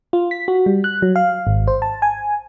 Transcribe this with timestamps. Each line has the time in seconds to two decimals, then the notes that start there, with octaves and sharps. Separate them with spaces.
0.13 F4
0.31 B6
0.48 F#4
0.66 G3
0.84 F#6
1.02 F#3
1.16 F5
1.47 G#1
1.67 C5
1.82 A5
2.02 G#5